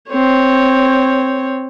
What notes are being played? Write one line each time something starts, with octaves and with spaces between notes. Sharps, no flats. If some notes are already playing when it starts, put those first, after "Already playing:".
C4 C#5